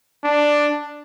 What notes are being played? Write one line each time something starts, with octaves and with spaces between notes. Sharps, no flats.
D4